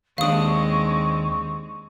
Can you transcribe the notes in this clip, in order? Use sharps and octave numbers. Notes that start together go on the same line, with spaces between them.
D#2 G#3 C4 D4 F5 C#6 D#6